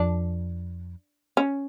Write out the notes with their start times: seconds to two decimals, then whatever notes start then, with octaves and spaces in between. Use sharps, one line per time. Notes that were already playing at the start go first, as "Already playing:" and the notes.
Already playing: F2 D4
1.37 C#4